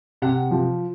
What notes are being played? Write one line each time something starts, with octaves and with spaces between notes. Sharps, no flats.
C3 F#5
F3